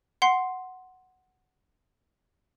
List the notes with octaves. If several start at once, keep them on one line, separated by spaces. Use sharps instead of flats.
F#5 C6 C7